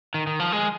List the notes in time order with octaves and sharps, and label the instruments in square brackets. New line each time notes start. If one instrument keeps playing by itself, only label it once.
[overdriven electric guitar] D#3
D#3
F3
G#3